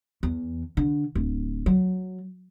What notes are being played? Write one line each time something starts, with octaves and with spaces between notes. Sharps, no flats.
E2
D3
D1
F#3